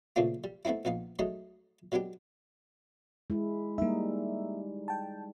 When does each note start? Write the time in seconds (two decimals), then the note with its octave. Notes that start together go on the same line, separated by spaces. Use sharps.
0.16 A#2 C#3 A3 C4 D4 F4
0.44 G3
0.65 A3 B3 C4 D#4 E4
0.85 A#1 B3 D#4 F5
1.19 F#3 G#3 A3 D#4 D#5
1.92 F#3 G#3 B3 D4 G4
3.30 G#3 E4
3.78 G3 A#3 D#4 E5
4.88 G5 A5